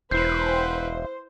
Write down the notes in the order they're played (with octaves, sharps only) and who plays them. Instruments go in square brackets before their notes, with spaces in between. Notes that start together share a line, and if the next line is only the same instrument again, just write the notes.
[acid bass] E1 [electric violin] E4 B4 [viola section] C5 [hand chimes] G6 C7